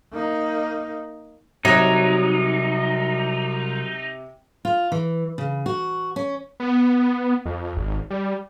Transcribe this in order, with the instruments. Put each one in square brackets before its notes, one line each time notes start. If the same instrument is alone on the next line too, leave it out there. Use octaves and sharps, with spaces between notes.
[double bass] A#3 D#4
[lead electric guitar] C2 [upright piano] C3 [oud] F#3 [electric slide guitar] D#4
[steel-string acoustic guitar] F4
E3
C#3
F#4
C#4
[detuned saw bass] B3
F2
G#1
G3